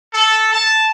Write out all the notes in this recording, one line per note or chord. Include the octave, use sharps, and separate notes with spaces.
A4
A5